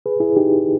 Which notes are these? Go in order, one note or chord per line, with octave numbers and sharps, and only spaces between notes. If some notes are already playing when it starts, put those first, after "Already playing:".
G#4 B4
E4 G#4
D#4 G4